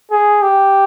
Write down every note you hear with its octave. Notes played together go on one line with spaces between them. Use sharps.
G#4
G4